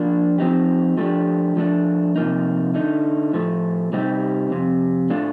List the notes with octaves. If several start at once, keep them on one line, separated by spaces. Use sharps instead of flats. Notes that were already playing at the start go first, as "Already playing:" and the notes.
Already playing: F3 A#3 D4
F3 C4 D#4 G4
F3 A3 D4 G4
F3 A3 D4
C3 F3 A#3 D#4
D3 A3 D#4
A2 F3 A3
C3 G3 C4 D#4 G4
F2 C3
A2 A3 D4 F4